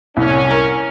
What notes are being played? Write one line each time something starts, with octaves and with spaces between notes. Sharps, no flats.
C2 C#4
A#4